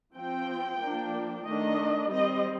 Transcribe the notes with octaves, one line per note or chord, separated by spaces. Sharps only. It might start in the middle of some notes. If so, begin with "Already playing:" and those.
F3 C4 G5
F3 A#3 D4
D#3 A3 D4 D#5
G3 C4 D#5